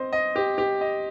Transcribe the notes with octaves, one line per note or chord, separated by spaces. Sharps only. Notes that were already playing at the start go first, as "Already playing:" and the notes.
Already playing: C4 C5 D#5
D#5
G4
G4
D#5